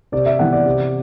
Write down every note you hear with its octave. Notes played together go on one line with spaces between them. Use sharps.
C3 D5
E5
E3 B3 F#5
D5
C3